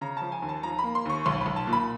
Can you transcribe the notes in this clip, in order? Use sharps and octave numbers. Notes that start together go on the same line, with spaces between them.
C#3 A#5
F3 A5
G#5
D#2
A5
F3 A#5
A#3 B5
C6
D#2 C#6
B1 C6
B1 B5
A5
A#2
B5